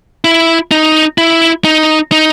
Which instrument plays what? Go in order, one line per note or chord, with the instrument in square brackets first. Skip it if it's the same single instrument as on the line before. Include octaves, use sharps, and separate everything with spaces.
[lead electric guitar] E4
D#4
E4
D#4
D#4